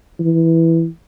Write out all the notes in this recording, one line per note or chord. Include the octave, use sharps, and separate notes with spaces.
E3